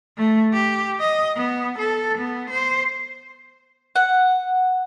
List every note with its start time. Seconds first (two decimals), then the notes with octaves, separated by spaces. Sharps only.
0.18 A3
0.53 G4
1.00 D#5
1.36 B3
1.78 A4
2.18 B3
2.50 C5
3.96 F#5